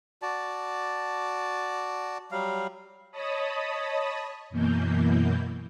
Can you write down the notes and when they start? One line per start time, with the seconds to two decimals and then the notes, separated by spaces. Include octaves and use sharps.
0.22 F#4 D5 A5
2.32 F#3 G3 F5
3.11 C#5 D#5 A5 B5 D#6
4.50 F#2 B2 E3 A#3 G6